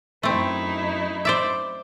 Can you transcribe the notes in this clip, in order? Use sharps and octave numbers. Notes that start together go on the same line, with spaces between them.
F#2 A3 C4 D#4 E4
C5 D5 E5